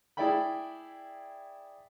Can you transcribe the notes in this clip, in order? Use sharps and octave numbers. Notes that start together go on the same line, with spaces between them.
E4 G#4 D5 E5 G5 B5